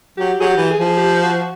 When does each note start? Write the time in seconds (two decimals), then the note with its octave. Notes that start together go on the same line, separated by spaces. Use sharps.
0.18 F#3 G4
0.38 F#3 G#4
0.44 G4
0.57 E3
0.70 G#4
0.78 F3
0.86 G#4
0.97 G4
1.23 F#4